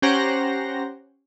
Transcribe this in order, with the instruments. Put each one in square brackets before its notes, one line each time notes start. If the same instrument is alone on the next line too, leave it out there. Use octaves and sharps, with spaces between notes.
[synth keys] C#4 G4 C5 F#5 A#5 A#6